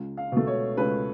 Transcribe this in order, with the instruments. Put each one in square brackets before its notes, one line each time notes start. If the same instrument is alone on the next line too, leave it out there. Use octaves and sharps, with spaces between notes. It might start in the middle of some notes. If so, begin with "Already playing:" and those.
Already playing: [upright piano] C#2
F5
B2 A3
C#5
C#2 B4